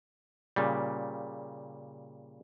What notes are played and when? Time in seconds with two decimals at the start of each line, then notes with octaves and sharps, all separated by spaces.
0.56 A#2 C#3 G3